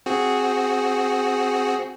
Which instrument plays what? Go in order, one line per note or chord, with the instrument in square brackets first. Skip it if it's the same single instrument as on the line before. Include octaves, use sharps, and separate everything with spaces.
[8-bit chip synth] C4 F#4 G#4